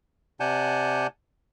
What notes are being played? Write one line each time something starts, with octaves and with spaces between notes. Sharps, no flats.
C3 D5 F#5 G#5 A5 G6